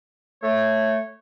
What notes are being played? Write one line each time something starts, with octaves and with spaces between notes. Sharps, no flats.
A3 C#5